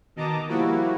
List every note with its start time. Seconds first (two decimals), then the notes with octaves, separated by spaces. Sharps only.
0.16 B2 D#3 D#5 A5 A#5 D6
0.48 F3 G3 A#3 E4 F#4